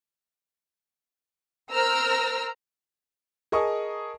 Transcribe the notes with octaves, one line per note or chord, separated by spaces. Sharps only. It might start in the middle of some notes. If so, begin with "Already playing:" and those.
A#4 C5 A#5 E6 F6
G#4 A#4 D#5 A5 C#6 D#6